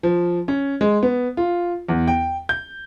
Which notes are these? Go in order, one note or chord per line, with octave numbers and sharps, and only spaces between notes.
F3
C#4
G#3
B3
F4
E2
G5
G6